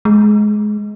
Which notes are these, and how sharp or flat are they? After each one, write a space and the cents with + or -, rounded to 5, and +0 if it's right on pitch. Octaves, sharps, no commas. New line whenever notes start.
G#3 +20